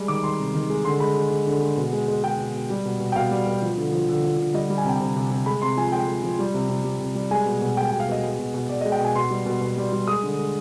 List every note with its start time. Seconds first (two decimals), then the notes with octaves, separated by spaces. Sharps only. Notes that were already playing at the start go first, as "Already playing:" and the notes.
Already playing: G3 G#3
0.08 D#3 D6
0.23 D#3 C6
0.39 C3
0.55 D#3
0.70 G#3
0.85 D3 C6
1.00 G#3 B5
1.16 G#3
1.31 G#3
1.47 D3
1.62 G#3
1.77 B2
1.93 G#3
2.08 G#3
2.24 G#3 G5
2.39 B2
2.54 B2
2.70 G3
2.85 B2
3.00 B2
3.12 G5
3.16 B2 F5
3.31 G3
3.47 B2
3.62 F3
3.77 D3
3.93 F3
4.08 D3
4.23 F3
4.38 D3
4.54 G3 D#5
4.70 G3
4.78 G#5
4.85 C3 G5
5.00 C3
5.16 C3
5.30 C3
5.46 G#3 B5
5.62 C3 C6
5.77 F3 G#5
5.92 G#3 G5
6.08 G#3
6.23 F3
6.39 G3
6.54 C3
6.70 C3
6.84 G3
7.00 C3
7.15 G3
7.31 G#3 G#5
7.46 B2
7.62 B2
7.77 G#3 G5
7.89 G5
7.92 B2
8.00 F5
8.08 B2 D#5
8.24 G#3
8.39 B2
8.54 B2
8.69 B2 D5
8.81 D#5
8.85 G#3
8.92 G5
9.01 B2 G#5
9.15 B2 C6
9.31 G3
9.46 B2
9.61 B2
9.77 G3
9.93 G3
10.07 G#3 D#6
10.23 D3
10.39 G#3